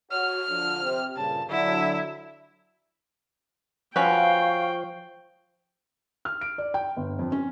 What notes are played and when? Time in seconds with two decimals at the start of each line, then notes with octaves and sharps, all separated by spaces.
0.11 F#4 C#5 F6
0.49 D3 F3
0.83 C3
1.16 G2 A#2 C#3 A5
1.49 D3 F#3 E4
3.96 F3 C#4 F#4 B4 F5 G5 C#6
6.25 F6
6.41 D7
6.58 D5
6.74 G5
6.97 G1
7.19 F2
7.32 C#4